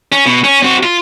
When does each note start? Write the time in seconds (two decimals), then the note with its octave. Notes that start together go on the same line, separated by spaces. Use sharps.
0.12 C#4
0.26 B2
0.44 C#4
0.63 C4 F#4
0.83 F4